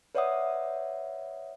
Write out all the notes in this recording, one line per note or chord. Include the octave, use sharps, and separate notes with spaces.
B4 C#5 D5 E5 F#5 D#6